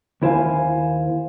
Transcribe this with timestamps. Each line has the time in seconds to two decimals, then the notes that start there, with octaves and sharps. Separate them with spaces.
0.22 D#2 E4 C5 F5 G#5